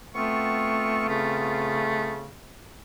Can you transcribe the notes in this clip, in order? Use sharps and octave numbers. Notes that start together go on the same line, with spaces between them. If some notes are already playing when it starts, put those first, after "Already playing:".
A3 B3 C4 F4 C#6
C#3 A3